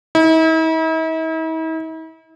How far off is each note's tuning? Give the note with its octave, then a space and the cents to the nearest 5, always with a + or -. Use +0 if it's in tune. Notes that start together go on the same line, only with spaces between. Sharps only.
E4 -45